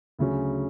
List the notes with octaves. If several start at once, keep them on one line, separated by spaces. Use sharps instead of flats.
D2 C#3 F#3 C#4